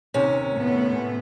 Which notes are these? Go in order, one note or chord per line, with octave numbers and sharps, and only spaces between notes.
D#2 C3 C#4
A2 B3